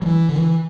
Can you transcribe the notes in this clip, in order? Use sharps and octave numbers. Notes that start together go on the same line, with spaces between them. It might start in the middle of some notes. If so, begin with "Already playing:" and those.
F#3
E3
D3
E3